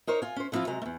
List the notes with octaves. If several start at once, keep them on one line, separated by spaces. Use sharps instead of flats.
D#4 A#4 C5 C#5
F4 G#5
C#4 C5
D3 F3 C4 E4 F4
C3 F#3 G#3 A#5
E2 A3